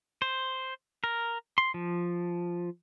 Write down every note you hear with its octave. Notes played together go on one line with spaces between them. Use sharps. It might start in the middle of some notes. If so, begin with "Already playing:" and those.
C5
A#4
C6
F3